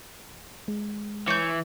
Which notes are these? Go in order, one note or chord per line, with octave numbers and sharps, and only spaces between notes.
G#3
E3 C#5 G6